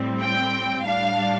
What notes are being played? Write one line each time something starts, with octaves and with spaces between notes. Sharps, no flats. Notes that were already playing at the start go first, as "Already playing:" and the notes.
Already playing: A2 G3 C4
G5
A2 G3 D4 F5